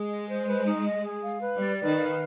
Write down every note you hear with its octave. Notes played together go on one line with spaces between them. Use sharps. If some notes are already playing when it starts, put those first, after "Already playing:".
Already playing: G#3 G#4
D#5
C5
B4
D#4
D#5
G#4
F5
B4
G3 D5
B4
D#3
F5